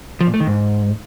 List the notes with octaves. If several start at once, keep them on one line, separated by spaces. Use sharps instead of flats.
F3
A#2
A3
D#3
G#2